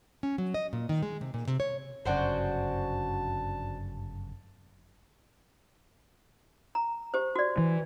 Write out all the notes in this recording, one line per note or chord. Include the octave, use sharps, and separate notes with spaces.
C#4
F#3
D#5
A#2
D#3
G#3
C3
A#2
C3
C#5
G1 F#2 C#3 D4 F#4 C5 A5
A#5
G4 C5
F#4 D5
E3